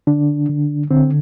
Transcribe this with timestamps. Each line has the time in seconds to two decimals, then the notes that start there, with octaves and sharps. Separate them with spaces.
0.07 D3 D4
0.49 D3
0.90 D3 C4